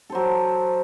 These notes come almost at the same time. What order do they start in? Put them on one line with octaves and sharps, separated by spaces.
A4 C5 F#3